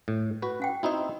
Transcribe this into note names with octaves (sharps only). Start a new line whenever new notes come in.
A2
F#4 B4
C#4 F#5 G5
C4 D#4 E4 F#4 D#5